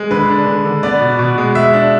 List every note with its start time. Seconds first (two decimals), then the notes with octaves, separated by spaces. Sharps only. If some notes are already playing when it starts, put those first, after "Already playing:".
Already playing: G#3
0.10 D3 B4
0.29 D4
0.47 D3
0.65 D3
0.83 B3 D5
1.01 B2
1.19 B2
1.38 G#3
1.55 G#3 E5
1.74 D4